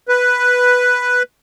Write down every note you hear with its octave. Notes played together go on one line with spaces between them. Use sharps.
B4